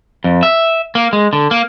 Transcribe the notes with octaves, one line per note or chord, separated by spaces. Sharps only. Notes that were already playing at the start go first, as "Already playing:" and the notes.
F2
E5
A#3
G#3
D3
A#3